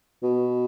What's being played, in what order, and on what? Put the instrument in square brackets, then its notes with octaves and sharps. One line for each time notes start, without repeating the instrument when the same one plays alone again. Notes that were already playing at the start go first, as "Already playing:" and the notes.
[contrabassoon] B2